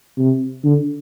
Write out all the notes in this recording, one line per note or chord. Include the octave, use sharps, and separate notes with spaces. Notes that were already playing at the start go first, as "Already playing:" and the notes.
C3
D3